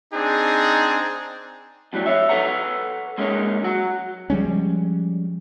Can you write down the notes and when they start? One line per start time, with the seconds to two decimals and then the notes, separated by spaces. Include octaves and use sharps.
0.14 C4 D4 D#4 G#4
1.93 F2 A2 F#3 G3
2.06 C#5 E5
2.29 A4 B4 C#5 F#5 A#5
3.18 G#3 A#3 C#4 D#4 C#5
3.63 F#3 F#4
4.30 F3 G3 G#3 C#4